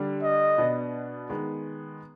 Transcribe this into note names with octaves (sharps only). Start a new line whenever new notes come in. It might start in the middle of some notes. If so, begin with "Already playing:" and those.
Already playing: D3 G3 D4
D#5
B2 B3 D4
D#3 G#3 B3